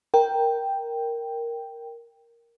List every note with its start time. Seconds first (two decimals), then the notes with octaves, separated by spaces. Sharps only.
0.14 A#4 G5